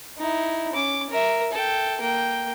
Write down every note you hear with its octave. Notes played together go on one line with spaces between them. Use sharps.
D#4 E4
C#4 D6
A#4 E5
A4 G5
A#3 G5